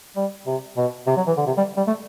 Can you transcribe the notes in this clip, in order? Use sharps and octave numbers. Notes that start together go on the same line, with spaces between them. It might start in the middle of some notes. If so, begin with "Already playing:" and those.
G3
C3
B2
C3
F#3
E3
D3
C3
G3
G3
A3